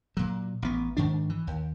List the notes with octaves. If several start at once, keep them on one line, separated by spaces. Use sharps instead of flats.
A#2 F#3
A1 B3
G#2 D#3 D4
E3
D#2